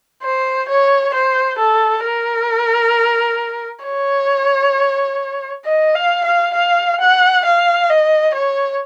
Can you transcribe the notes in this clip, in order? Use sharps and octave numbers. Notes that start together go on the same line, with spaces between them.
C5
C#5
C5
A4
A#4
C#5
D#5
F5
F5
F5
F#5
F5
D#5
C#5